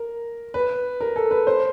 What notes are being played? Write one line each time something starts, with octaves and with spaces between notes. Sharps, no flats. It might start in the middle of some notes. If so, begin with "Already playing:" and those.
Already playing: A#4
B4
A#4
A4
B4
C5